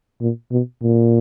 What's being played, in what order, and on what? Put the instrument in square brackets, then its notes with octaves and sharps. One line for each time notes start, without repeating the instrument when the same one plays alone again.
[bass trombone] A#2
B2
A#2